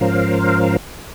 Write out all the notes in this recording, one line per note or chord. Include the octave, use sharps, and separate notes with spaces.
G#2 F3 C#4 A#4 C5 F5